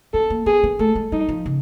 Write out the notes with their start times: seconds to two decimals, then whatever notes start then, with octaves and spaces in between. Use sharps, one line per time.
0.14 B3 A4
0.30 A#3
0.46 B3 G#4
0.63 B3
0.79 A3 A4
0.95 G#3
1.12 G3 D#4
1.29 F3
1.46 C#3